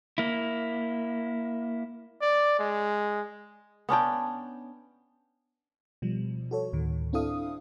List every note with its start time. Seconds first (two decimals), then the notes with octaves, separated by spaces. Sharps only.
0.18 A#3 E4
2.21 D5
2.59 G#3
3.89 B3 C#4 D4 G5
6.02 B2 F3 G3
6.51 F#4 A4 C#5
6.73 D2 A2 D#3
7.13 C4 D4 E4 A4 F5 D#6